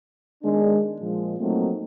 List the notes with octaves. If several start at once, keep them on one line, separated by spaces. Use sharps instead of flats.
D#3 G#3 B3 D4
A#2 F3 G#3
F#3 A3 A#3 C4 D#4 F4